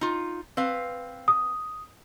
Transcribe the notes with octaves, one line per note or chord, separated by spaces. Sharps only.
D#4 F4
C4 B4 F5
D#6